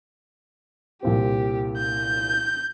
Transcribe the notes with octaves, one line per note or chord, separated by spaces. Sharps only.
C2 A#2 C4 G4
G6